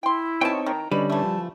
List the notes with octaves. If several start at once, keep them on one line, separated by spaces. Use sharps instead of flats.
E4 G5 C6
B2 E3 C4 D#4 C#5 G5 A5
D#3 A#5
D3 G3 C#4 D4 B4 D#5
E3 A3 A5
F3